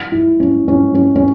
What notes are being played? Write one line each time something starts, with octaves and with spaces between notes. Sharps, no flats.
E4
C#4
C#4
C#4
C#4